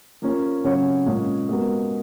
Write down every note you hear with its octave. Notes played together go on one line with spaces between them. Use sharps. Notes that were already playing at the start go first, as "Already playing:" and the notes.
F3 A#3 C#4
C#3 F#3 C#4 F#4 C#5
A#2 G#3 C#4
G#3 B3 F#4 A#4